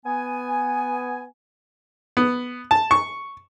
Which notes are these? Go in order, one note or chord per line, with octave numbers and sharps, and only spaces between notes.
B3 G#5
B3
A5
C#6